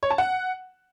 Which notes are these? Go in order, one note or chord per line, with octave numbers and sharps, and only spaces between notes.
C#5
A5
F#5